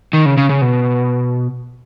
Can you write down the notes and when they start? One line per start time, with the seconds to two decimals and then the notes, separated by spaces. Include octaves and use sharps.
0.13 D#3
0.26 C#3
0.37 C#3
0.49 C#3
0.61 B2